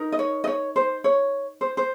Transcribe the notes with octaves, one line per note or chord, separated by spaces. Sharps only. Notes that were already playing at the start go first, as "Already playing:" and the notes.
Already playing: D#4 A#4
D#5
C#5
D#5
C#5
C5
C#5
C5
C5